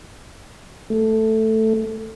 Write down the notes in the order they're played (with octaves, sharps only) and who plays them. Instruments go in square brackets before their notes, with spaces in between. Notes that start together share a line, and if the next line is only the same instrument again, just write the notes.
[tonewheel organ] A3